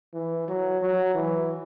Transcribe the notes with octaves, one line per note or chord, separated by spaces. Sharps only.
E3
F#3
F#3
E3